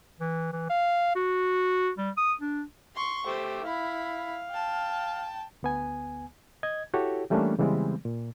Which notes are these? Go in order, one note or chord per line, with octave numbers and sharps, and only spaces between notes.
E3
E3
F5
F#4
G3
D#6
D4
C6 C#6
A3 G4 C5 E6
E4 F5 B5
G5 A5
D2 B3 G#5
D#5 G#6
E4 F#4 G4 A4 C#5
E3 G3 A3 A#3 C#4 D4
C#3 E3 G3 G#3 B3 C4
A#2